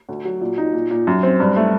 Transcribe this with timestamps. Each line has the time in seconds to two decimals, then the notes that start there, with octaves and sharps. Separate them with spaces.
0.09 D2
0.25 F#3
0.41 A#2
0.58 D#4
0.74 A#2
0.91 A#2
1.07 F#2
1.23 C4
1.40 G2
1.56 A3